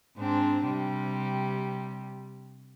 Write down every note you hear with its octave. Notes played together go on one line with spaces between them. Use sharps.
G#2 C4 D4
C3 G3